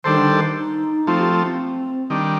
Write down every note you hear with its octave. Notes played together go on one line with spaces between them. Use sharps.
D#3 G3 D4 A4 C5
D3
D#3
D#4
F3 A3 C4 F4
G4
F4
C4
D#3 G3 D4